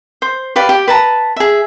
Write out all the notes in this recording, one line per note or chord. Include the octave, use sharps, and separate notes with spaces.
C5
G4 B4 D5 F5
G4
B4 A5 A#5
G#4 E5